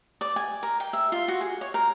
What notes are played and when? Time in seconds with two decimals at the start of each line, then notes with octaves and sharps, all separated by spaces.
0.21 D5
0.36 G#5
0.63 A#4
0.80 G5
0.93 E5
1.12 F4
1.28 F#4
1.41 G#4
1.61 C#5
1.74 A#4